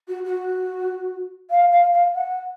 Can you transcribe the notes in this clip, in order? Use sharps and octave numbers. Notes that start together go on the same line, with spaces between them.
F#4
F#4
F5
F5
F5
F#5